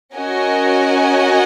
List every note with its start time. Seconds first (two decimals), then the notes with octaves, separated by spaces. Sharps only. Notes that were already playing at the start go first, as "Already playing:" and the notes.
0.15 C#4 F#4 A#4 D#5 G#5